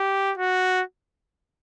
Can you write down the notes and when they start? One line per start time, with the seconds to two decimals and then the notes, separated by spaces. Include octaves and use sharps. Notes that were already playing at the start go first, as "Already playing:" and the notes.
Already playing: G4
0.37 F#4